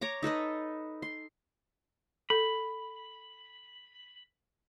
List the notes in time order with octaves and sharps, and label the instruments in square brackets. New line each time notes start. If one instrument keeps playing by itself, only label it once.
[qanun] C#5 A#5 D6
D#4 A4 B4 D#5
C6
[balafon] A4 [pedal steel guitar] B5